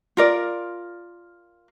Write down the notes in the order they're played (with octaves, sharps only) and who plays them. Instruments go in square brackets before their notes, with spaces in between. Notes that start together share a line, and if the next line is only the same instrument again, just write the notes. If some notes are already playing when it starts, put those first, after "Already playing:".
[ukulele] F4 A#4 D5